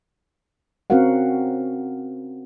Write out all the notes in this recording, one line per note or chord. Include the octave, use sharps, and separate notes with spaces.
C4 C#4 F#4 A#4 F5 F#5